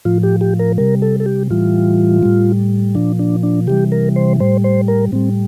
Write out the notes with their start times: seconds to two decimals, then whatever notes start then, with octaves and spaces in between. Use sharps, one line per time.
0.05 A2 F3 F4
0.23 G4
0.41 G4
0.59 A#4
0.78 C3 G3 A#4
1.02 A4
1.20 A4
1.26 G4
1.50 A2 E3 G3 F4
2.23 A2 G3
2.95 A#2 F3 D4
3.19 D4
3.43 D4
3.67 C3 E3 G3 G4
3.92 A#4
4.16 C5
4.40 A2 G3 C5
4.64 C5
4.88 A#4
5.12 A2 G3 C4